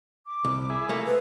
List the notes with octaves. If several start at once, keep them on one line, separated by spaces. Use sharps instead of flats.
D6
C2
E4 G#4
A3 A#3
G#4 B4 C5